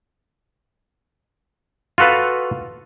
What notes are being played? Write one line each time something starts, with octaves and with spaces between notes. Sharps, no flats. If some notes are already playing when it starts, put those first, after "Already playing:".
F4 F#4 A4 B4 F5